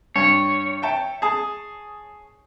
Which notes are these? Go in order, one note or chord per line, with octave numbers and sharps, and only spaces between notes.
G2 C#5
E5 G5 A5
G#4 A5 D#6